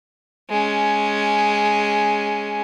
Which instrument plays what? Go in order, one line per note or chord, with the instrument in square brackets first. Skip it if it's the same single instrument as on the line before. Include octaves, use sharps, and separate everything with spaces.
[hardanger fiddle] G#3 C#4